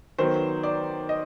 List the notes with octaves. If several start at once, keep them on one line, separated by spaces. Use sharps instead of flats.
D#3 F#3 B3 C5
D5
D#5